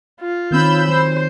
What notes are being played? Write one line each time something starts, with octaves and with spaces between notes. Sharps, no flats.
F4
D#3 C4 C#4 B5 E6 G6
F#3 C5